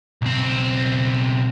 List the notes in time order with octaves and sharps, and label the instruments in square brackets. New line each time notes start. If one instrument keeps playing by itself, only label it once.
[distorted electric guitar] B1 C4